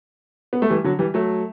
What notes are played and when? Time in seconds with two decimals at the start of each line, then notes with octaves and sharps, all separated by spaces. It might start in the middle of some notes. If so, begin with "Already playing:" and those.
0.53 B3
0.62 A3
0.70 E3 G3
0.84 D3 F#3
0.99 E3 G3
1.14 F#3 A3